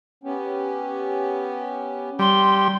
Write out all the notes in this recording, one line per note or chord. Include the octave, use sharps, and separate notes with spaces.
B3 C#4 G4
G3 C6